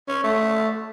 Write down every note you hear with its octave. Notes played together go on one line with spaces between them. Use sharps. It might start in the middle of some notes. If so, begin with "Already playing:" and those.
C#4
A3